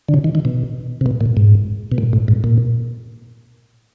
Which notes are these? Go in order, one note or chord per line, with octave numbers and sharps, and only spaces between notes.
D3
C#3
D#3
D#3
B2
C3
B2
A#2
G#2
B2
A#2
A2
G#2
A#2